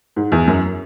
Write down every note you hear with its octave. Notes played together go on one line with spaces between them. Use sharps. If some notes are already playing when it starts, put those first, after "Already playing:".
G#2
E2
F#2